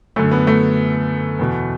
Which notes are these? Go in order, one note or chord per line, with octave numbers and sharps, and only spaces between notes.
F#2 D3 A3
B3
A3
E2 B2